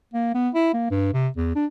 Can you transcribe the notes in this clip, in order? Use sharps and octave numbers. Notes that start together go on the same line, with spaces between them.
A#3
B3
E4
A#3
G2
C3
E2
D4